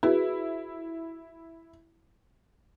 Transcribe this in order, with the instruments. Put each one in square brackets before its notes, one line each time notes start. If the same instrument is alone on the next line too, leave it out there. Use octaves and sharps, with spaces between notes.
[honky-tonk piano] E4 [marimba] F#4 G#4 B4